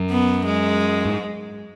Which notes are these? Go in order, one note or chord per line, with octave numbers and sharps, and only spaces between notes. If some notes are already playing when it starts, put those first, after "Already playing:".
Already playing: F#2
B3
G#3
G#2